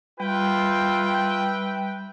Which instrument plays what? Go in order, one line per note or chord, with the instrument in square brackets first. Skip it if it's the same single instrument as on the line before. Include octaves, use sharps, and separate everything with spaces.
[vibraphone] G3 [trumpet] F4 [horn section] B4 E5 G5